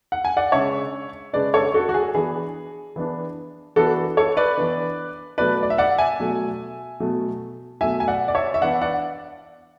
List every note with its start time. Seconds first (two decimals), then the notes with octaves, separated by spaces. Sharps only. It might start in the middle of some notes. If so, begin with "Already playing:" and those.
0.12 F#5
0.25 G#5
0.37 D5 F#5
0.52 C#3 G#3 D4 C#5 E5
1.33 C#3 G#3 D4 B4 D5
1.54 A4 C#5
1.74 F#4 A4
1.89 F#4
1.94 G#4
2.15 E3 B3 D4 G#4
2.96 E3 B3 D4
3.76 E3 B3 D4 F#4 A4
4.17 A4 C#5
4.37 B4 D5
4.58 E3 B3 D4
5.38 B2 F#3 A3 B4 D5
5.63 D5
5.70 E5
5.78 D5 F#5
5.98 E5 G#5
6.19 B2 F#3 A3
7.00 B2 F#3 A3
7.81 B2 F#3 A3 E5 G#5
8.00 G#5
8.08 D5 F#5
8.28 D5
8.35 C#5 E5
8.54 E5
8.61 E3 B3 D4 D5 F#5
8.81 D5 F#5